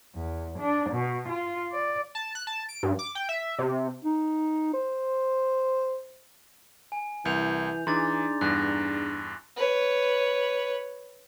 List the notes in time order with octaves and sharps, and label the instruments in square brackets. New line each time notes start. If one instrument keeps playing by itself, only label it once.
[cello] E2
D4
B2
F4
D5
[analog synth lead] A5
F#6
A5
D7
G2
D6
G5
E5
C3
[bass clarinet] D#4
C5
[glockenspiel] G#5
[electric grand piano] C2 [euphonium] E3 [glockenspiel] G6 F7
[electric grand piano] E3 [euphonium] D4 [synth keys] D#4 G#4 A#5 [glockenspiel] C6 D6 A6
[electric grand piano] E2 G2 [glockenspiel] F#6 A#6
[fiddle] B4 C#5